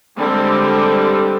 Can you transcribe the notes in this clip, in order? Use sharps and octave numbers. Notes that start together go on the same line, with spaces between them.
D3 G3 G#3 C4